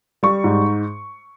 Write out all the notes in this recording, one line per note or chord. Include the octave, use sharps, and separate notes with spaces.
G3 C#6
G#2